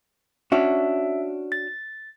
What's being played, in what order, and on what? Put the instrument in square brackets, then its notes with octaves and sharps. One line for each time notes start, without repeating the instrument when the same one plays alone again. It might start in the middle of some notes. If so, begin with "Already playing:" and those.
[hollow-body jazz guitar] C#4 D4 F#4 [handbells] E5
[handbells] A6